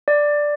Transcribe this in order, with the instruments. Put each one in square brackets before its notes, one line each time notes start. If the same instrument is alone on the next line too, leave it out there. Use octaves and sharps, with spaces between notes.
[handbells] D5